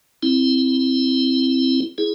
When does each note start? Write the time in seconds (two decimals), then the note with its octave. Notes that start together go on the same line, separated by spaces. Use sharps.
0.23 C4 E4
1.98 E4 G#4